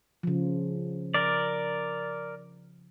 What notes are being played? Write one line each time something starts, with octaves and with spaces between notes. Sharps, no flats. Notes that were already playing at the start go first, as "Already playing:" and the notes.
C#3 F3
A#4 D5